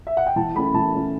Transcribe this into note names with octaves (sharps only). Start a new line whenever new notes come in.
E5
F#5
G5
E3 A5
A3 C#4 B5
E3 A5
A3 C#4